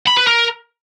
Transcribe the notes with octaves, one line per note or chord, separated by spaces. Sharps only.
B5
B4
A#4